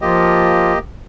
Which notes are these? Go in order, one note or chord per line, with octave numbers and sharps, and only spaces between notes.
F3 A#3 F4 G4 D#5